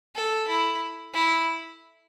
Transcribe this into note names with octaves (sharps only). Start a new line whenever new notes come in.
A4
E4
E4